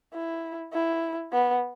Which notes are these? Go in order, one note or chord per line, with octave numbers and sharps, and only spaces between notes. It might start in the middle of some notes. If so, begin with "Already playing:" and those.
E4
E4
B3